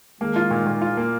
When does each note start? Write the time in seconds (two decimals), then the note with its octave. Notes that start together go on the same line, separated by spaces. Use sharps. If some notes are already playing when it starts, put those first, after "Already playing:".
0.20 D#3 G#3 A#3
0.36 F4
0.51 A#2
0.66 A#2
0.82 F4
0.97 A#3